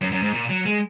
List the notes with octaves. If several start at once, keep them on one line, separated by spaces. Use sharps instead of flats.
F#2
F#2
G#2
A#2
F#3
G#3